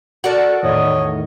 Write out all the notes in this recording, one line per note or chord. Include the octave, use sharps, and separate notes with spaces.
F#4 A4 A#4 D5 F#5
E2 A2 D#3 C#5 D#5